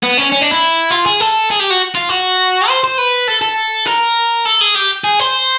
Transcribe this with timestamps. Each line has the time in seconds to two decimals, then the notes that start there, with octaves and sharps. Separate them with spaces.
0.03 B3
0.18 C#4
0.32 C#4
0.42 D4
0.52 E4
0.91 F4
1.06 G#4
1.20 A4
1.50 G#4
1.59 G4
1.70 F#4
1.95 F4
2.09 F#4
2.68 C5
2.84 C5
2.98 B4
3.28 A4
3.42 A4
3.86 A#4
4.45 A4
4.61 G#4
4.75 G4
5.04 G#4
5.19 C5